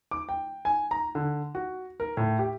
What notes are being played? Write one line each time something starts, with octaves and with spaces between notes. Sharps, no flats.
D6
G5
G#5
A#5
D3
F#4
A#4
A2
G4